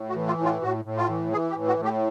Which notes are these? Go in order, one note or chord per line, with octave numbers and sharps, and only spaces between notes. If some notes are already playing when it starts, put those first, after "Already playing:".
Already playing: A2
F#4
E3
F4
A2
F4
A2 F#4
A2
F4
E3
E3 G#4
G4
A2
F#4
A2
G4